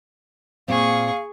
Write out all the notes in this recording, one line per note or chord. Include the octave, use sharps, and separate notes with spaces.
A#2 C4 G#4 F5 C#6